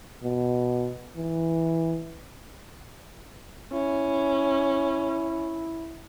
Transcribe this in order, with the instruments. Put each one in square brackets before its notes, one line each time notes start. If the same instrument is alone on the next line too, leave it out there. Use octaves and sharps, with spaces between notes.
[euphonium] B2
E3
[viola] C#4 [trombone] E4